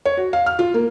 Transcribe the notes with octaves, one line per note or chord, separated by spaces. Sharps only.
C#5
F#4
F5
F6
F4
A#3